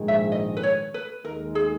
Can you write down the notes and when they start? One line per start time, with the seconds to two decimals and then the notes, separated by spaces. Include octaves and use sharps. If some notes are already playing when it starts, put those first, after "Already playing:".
Already playing: A#1 G#2 D#3 G#3
0.08 E5
0.32 D#5
0.57 B4
0.63 C#5
0.94 B4
1.25 D#2 D#3 G#3 D#4 A#4
1.55 G#4